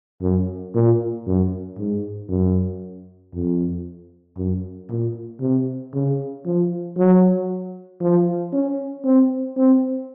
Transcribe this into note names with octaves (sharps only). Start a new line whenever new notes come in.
F#2
A#2
F#2
G#2
F#2
F2
F#2
A#2
C3
C#3
F3
F#3
F3
C#4
C4
C4